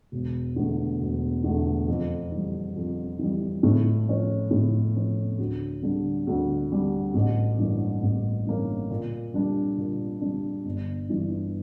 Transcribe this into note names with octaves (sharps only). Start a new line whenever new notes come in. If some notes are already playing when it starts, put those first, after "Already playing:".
E1
E2 D3 A3
E1
E2 D3 A3
F2
E3 G3
F2
E3 G3
A2
F3 C#4
A2
F3 C#4
D2
D3 G3 D4
D2
D3 G3 D4
A1
G2 E3 A#3 C#4
A1
G2 E3 A#3 C#4
A#2
G3 D4
A#2
G3 D4
G1
G2 E3